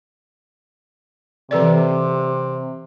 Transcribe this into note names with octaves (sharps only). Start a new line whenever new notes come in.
C3 E3 A4 D5